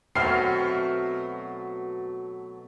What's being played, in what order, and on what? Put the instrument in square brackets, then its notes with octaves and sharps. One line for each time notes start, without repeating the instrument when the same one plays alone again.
[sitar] B2 F#3 A3 [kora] C4 F#4 [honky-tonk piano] F6 C7